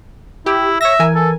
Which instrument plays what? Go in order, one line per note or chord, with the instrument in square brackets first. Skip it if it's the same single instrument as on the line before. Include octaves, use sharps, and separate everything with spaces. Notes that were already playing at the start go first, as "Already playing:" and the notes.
[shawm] E4 [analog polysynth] G4
[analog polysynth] C#5 A#6 [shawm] E5
[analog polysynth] E3 A#4 G#5
[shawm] A4